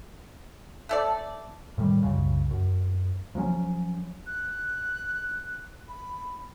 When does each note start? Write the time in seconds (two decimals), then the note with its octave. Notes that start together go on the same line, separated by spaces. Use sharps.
0.89 A3 A4 D5
1.78 A2 D#3 G3
2.03 C2 F#2 C#3
2.51 F#2
3.35 F3 F#3 A#3 C#4
4.26 F#6
5.87 B5